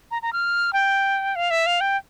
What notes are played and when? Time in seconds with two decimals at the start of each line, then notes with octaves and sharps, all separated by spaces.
0.11 A#5
0.22 A#5
0.33 F6
0.73 G5
1.35 F5
1.50 E5
1.66 F5
1.80 G5